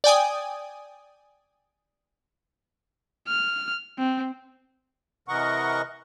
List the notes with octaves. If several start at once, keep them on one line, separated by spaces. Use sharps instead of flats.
D5 G5 G#5 D#6
F6
C4
C3 E3 A#4 D#5 F#5 C#6